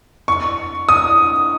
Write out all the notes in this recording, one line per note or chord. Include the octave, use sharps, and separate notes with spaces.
C#6
D#6